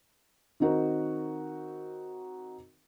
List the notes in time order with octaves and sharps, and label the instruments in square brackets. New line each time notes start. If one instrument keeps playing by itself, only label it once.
[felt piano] D#3 C4 D#4 F#4 A#4